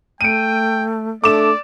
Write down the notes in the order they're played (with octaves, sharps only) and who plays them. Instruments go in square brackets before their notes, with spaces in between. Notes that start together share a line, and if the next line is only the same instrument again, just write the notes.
[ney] A3 [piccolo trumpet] G5 [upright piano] D7 D#7
[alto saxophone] A3 [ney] D4 [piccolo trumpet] D5 [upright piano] D6 E7